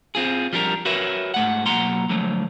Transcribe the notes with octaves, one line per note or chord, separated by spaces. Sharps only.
C4 F4 G#4
F3 G3 D4 A#4
F#4 A#4 B4 C#5 E5
G#2 A3 F#5
B1 F#3 A#3 F#5 A#5 C6
D3 F3 F#3 A3